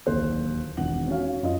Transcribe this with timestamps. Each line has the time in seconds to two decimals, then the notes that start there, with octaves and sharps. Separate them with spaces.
0.06 D1 D#2 C5 F#6
0.77 E1 E2 D#3 F#5 F#7
1.07 C#4 D#4 F#4 F5
1.43 F#2 F4 D#5